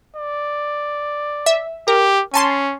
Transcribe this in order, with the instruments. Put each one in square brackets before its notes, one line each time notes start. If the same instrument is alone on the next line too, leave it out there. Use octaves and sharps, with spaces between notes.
[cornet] D5
[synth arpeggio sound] E5
[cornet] G4 [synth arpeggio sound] A#4
[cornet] C#4 [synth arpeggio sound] G#5 A5 C6